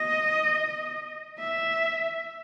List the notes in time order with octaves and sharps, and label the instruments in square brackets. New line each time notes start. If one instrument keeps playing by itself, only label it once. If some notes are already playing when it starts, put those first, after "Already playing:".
Already playing: [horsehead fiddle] D#5
E5